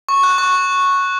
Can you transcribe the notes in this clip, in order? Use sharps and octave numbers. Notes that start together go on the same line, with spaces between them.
C#6
F#6
C#6